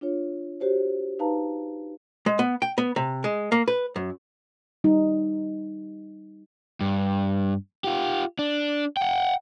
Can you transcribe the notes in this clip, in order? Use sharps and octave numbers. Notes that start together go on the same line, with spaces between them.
D4 F4 C#5
F#4 G4 C5 C#5
D#4 B4 F5 A5 A#5
G#3
B3
G5
B3
C3
G#3
A#3
B4
F#2
G3 D#4
G2
F4 G4
D4
F#5 G5